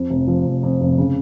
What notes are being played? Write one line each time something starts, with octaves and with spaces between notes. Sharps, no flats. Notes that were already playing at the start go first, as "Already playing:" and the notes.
Already playing: F2
F1
F3
F1
F2
F1
C#3